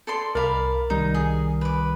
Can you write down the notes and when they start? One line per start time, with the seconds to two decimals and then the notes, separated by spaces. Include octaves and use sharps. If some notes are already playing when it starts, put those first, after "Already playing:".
0.07 A4 D5 C6
0.35 C2 A#4 D5 F5 B5
0.90 C2 D#3 G3 D#4
1.14 G#4
1.61 B4 D6